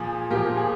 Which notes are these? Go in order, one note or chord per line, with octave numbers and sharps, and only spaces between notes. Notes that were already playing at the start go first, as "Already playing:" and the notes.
Already playing: A#2 F3 G#4
A#2 F3 G4 A#4
G#4